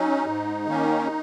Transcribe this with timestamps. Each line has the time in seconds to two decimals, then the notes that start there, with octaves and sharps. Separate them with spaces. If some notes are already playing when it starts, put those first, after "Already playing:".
Already playing: F#3 C#4 D#4
0.26 G#2
0.67 D#3 A#3 C#4